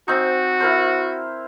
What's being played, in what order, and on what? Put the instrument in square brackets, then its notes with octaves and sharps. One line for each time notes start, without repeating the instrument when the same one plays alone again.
[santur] C4 D#4 [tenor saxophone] F#4
[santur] E4 A#4 C5